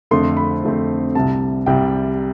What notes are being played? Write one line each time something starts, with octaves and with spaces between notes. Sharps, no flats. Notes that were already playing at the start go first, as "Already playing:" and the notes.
F2 D3 A3 C4 C6
B5
F2 D3 A3 C4
C2 C3 G3 A5
C2 C3 G3 G5